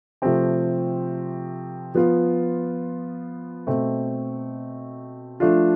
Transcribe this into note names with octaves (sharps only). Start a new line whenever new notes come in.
C3 F3 A3 C4 G4
F3 B3 F4
B2 A3 C4
F3 A3 D4 F4